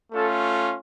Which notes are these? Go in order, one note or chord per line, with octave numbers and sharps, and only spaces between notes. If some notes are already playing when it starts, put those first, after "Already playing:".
A3 C#4 F4 A4